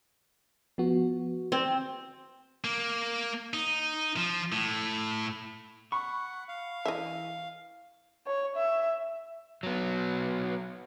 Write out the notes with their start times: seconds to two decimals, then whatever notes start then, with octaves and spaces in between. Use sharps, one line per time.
0.78 F3 B3 F#4
1.52 C4
2.64 A#3
3.53 D#4
4.17 F3
4.52 A2
5.92 F#5 B5 C#6
6.48 F5
6.85 E3 D#5 E5
8.27 C#5
8.57 E5
9.63 F#3 B3